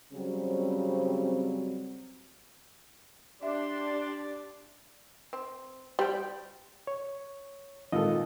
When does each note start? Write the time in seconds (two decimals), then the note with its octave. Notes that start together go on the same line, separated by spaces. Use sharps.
0.12 C#3 F#3 G3 C4
3.43 D4 G4 D5 E5 C6
5.33 C4
5.99 G3 C5 G5
6.87 C#5
7.92 G#1 A#2 F4 A4 D#5